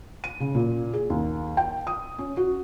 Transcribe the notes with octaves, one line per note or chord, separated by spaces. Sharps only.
D#7
C#3
A#2
G#4
D#2
G5
D#6
C#4
F#4